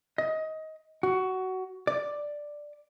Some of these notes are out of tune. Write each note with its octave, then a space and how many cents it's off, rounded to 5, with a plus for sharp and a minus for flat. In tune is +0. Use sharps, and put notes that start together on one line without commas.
D#5 +20
F#4 +15
D5 +5